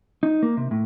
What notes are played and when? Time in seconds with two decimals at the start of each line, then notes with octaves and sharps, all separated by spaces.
0.23 D#4
0.43 A#3
0.57 C3
0.71 A2